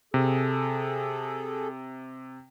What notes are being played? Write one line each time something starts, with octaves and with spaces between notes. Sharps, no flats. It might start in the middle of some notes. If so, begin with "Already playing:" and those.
C3 G#4 A4